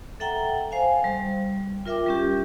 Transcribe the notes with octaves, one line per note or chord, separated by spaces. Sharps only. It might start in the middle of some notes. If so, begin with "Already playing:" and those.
A4 E5 F#5 G5 A#5
C5 F5 G#5
G3
F4 A#4 E5 G5 D6
G3 C#4 G4